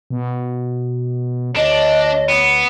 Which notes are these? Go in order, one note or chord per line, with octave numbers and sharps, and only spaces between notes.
B2
D2 D4 C#5 D#5
B3